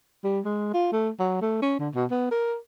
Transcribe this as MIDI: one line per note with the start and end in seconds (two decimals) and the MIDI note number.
0.24 0.40 55
0.45 0.71 56
0.74 0.89 65
0.92 1.09 57
1.20 1.38 54
1.41 1.59 57
1.62 1.77 61
1.79 1.89 50
1.95 2.05 47
2.11 2.27 59
2.31 2.56 70